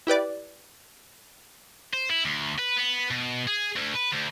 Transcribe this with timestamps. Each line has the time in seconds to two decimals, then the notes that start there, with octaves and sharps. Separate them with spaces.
0.07 E4 G4 B4 D5
1.93 C5
2.10 E4
2.25 D2
2.59 B4
2.77 B3
3.11 B2
3.48 G#4
3.76 D2
3.94 B4
4.12 D2